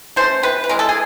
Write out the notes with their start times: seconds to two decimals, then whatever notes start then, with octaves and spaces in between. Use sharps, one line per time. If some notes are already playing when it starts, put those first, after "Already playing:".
0.16 A3 C#4 C5
0.43 C3 B4
0.64 B4
0.69 E3 G#3 A#4
0.79 A4
0.89 G#4